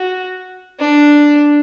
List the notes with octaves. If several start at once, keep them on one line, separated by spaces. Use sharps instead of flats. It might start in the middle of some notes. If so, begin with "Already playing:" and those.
Already playing: F#4
D4